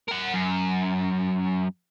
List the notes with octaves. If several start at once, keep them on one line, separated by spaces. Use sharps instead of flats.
A#4 F#5
F#2